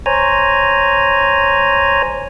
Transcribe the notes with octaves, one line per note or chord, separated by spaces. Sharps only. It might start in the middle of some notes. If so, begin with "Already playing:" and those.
C5 C#5 G#5 A#5